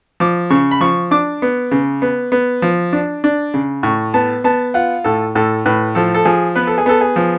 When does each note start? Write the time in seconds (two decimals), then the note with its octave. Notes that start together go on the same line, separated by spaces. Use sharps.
0.20 F3 D6
0.50 C#3 C#6
0.71 B5
0.81 F3 C#6
1.11 D4 D6
1.42 B3
1.71 C#3
2.02 B3
2.32 B3
2.62 F3
2.93 D4
3.24 D4
3.54 C#3
3.83 A2 C#6
4.14 B3 A5
4.44 B3 A5
4.74 F4 F#5
5.04 A2 A4
5.35 A2 A4
5.66 A2 B4
5.95 F3 A4
6.14 A4
6.25 F3 G#4
6.55 B3 B4
6.67 A4
6.78 G#4
6.86 B3 A4
7.01 G#4
7.16 F3